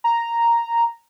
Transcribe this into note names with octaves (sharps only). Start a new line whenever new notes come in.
A#5